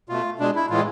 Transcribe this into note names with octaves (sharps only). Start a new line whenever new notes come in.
B2 A3 F4
B2 G#3 D4
E4
A2 E3 G#3 F4